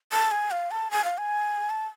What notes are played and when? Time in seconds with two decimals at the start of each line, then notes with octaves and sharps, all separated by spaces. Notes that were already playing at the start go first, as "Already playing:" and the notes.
0.12 A5
0.31 G#5
0.51 F5
0.71 A5
0.91 G#5
1.04 F5
1.18 G#5
1.70 A5